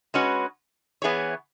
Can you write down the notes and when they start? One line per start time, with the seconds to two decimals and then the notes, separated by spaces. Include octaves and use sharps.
0.14 G#3 C#4 F#4 B4
1.02 E3 B3 E4 G#4 C#5